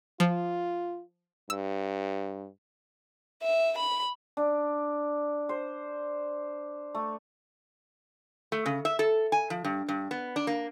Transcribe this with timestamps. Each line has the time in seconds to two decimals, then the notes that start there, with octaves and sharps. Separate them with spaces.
0.20 F3 F4
1.50 G2 E6
3.43 E5
3.78 B5
4.37 D4
5.49 C5
6.95 A3
8.52 A3
8.66 C#3
8.85 E5
8.99 A4
9.32 G#5
9.50 F3
9.64 G2
9.89 G2
10.11 B3
10.36 D4
10.47 A#3